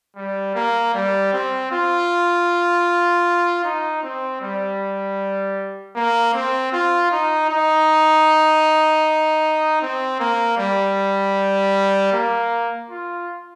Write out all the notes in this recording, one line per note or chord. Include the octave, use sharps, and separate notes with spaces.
G3
A#3
G3
C4
F4
D#4
C4
G3
A#3
C4
F4
D#4
D#4
C4
A#3
G3
A#3
F4